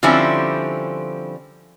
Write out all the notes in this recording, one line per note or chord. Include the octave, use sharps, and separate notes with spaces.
D3 F3 G3 C4 C#4 E4